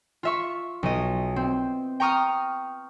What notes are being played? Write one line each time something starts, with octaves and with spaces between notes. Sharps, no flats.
F4 E5 C#6
B1 D#5
C4
G5 A#5 C#6 D#6 F6